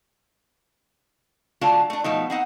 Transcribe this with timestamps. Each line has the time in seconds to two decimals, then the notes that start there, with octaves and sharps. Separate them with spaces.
1.61 D3 F#3 A3 D4 F4 A5
1.90 A3 D4
2.04 B2 F3 A3 D#4
2.30 C4 D#4 F#5